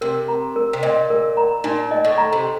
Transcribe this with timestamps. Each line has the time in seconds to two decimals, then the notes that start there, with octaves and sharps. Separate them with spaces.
0.01 C3 A#4
0.28 A#5
0.56 A#4
0.73 C3
0.83 A#2 D#5
1.10 A#4
1.37 A#5
1.64 A#2 D#4
1.91 D#5
2.05 A2
2.18 A#5
2.33 C3